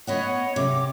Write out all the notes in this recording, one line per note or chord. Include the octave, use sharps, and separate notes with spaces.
B3 C#5 D#5 F#5
C3 D6